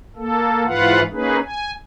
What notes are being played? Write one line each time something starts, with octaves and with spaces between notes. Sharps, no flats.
A#3 A4
G#2 E3 F4 B4 F5 F#5
A#3 C#4 D#4 G#4 B4
G#5